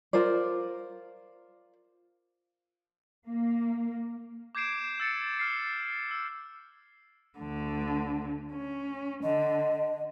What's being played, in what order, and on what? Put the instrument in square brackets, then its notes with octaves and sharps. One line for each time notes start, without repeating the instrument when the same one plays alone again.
[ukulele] F4 A#4 C5 D5
[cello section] A#3
[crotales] D6 G6 G#6 C7 D7 E7
E6 A6 C#7
F6 C7
E6
[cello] D2 D3
C#4
[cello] D3 [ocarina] D#5